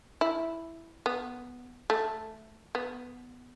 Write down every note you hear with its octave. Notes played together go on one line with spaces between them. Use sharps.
E4
B3
A3
B3